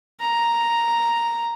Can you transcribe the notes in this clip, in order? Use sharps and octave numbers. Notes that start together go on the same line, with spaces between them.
A#5